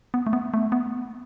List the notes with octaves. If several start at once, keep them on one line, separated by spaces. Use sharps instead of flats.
B3
A3
B3
A3
B3